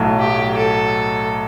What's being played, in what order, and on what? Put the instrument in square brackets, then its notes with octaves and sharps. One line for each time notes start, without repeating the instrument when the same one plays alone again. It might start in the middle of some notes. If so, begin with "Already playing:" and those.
Already playing: [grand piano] B1 A2 F#3
[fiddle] G4
A4